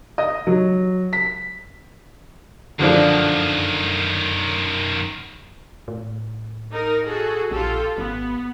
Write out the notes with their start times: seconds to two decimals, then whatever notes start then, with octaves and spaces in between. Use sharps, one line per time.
0.18 D#5
0.47 F#3
1.13 B6
2.79 F#2 D3 D#3 F3 D4
5.88 A2
6.73 D#4 A#4
7.07 F#4 G#4 A4
7.51 A#1 F4 G4 A4
7.98 G#1 B3